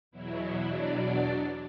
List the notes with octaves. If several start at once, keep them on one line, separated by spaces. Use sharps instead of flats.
E2 B2 F#3 E4
E4
D4 D5
D4 D5